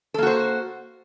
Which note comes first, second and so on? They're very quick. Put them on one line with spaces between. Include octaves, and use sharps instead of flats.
A4 A#3 F#4 C5